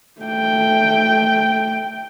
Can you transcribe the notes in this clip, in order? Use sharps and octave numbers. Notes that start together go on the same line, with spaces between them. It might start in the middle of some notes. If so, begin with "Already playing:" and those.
A3 G5